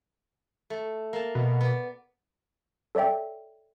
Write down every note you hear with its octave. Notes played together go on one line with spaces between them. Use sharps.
A3
A#3 A5
B2
B3 D5
A4 C#5 D5 E5 G5